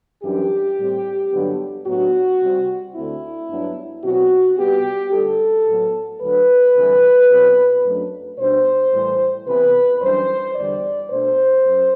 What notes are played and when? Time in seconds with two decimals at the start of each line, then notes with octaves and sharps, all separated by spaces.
0.23 F#2 E3 G3 D4 G4
0.78 A2 G3 C4
1.32 G2 D3 F#3 B3
1.86 A2 F#3 B3 D4 F#4
2.41 C3 G3 C4
2.95 D2 D3 A3 C4 E4
3.49 G2 F#3 B3 D4
4.04 B2 F#3 C4 F#4
4.58 C3 G3 B3 G4
5.12 D2 D3 G3 D4 A4
5.67 A2 F#3 B3
6.21 D2 D3 F#3 B4
6.75 D2 C3 E3 G3
7.30 B2 F#3 C4
7.84 F#2 F#3 A3 D4
8.38 B2 G3 D4 C5
8.93 A2 E3 G3
9.47 C3 E3 B3 B4
10.01 F#2 E3 G3 D4 C5
10.55 E2 D3 G3 D5
11.10 B2 A3 D4 C5
11.65 F#2